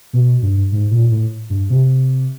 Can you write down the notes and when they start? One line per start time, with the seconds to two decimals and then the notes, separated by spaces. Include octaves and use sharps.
0.13 B2
0.43 G2
0.72 G#2
0.91 A#2
1.11 A2
1.50 G2
1.70 C3